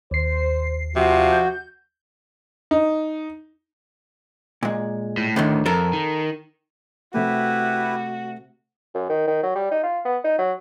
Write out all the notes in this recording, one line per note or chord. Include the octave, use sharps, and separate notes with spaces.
D#2 C5 C7
C3 F3 F#4
G6
D#4
A#2 G#3
A2
D2 A2 D3 D#3
F2 A4 A#4
D#3
C3 A3 E4 F#4 G4 B4
F#2
D#3
D#3
F#3
G3
D#4
F4
B3
D#4
F#3